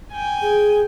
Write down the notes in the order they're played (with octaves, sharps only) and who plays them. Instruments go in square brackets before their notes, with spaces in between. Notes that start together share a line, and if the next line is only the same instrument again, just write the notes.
[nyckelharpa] G5 G#5
[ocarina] G#4